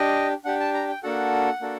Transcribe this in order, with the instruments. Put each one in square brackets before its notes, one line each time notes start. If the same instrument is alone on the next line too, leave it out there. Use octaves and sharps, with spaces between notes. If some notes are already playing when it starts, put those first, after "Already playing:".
Already playing: [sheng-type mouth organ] D4 G4 D#5
D4 G4 F#5
A5
A#5
G5
A#3 D4 F#4 A4 F#5
A#3 D4 F#4 A4